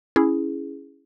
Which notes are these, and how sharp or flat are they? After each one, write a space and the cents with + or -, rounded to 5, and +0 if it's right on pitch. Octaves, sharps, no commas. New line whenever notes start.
C#4 +0 E4 +0 G#4 +0